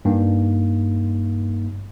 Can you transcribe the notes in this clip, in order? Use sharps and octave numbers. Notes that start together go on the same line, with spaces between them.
G2 A#3 D#4